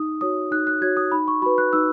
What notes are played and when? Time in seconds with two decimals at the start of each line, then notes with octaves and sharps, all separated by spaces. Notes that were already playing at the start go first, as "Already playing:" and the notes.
Already playing: D#4 D#6
0.21 F#4 C#5 D#6
0.51 D#4 F#6
0.67 F#6
0.82 F#4 C#5 G#6
0.97 D#6
1.12 D#4 B5
1.28 C#6
1.42 F#4 B4 B5
1.58 F#6
1.73 D#4 E6